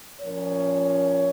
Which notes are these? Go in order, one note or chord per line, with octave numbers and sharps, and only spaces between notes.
A#2 F3 A#3 C#4 C#5